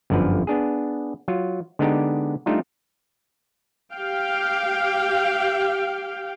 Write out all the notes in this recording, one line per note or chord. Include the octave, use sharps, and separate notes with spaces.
G1 F#2 D3 F3 B4
B3 D4 G#4
F#3 F4
D3 G#3 B3 D4 D#4 G4
G3 A3 D4 D#4 F4
G4 F5 G5